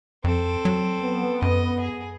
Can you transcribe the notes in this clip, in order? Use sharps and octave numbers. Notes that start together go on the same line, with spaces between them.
F2 C4 A4
F#3
B3
F#2 D#5
G#4